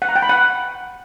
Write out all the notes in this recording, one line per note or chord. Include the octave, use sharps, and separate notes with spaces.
F#5
A#5
G5
B5
F#5